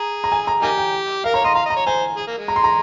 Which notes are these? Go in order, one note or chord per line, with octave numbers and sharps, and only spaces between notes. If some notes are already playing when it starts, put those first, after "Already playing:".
Already playing: G#4 A#5
A#5
G#5
A#5
A#3 D#4 G4 G#5
G5
A#4 F5
C#5 A#5
D#5 C6
F5 A#5
D#5 A#5
C#5
C5 G#5
G#4
A#3
G#3
A#5
C6
A#5